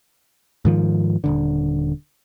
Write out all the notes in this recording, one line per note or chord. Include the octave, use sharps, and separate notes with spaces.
G#2 D#3 F3
D#1 G#1 D3